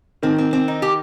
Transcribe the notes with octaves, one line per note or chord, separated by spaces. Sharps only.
D#3 C4
C4
C4
D#4
G4